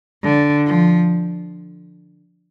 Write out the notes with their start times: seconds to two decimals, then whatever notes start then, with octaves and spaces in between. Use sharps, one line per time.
0.24 D3
0.67 F3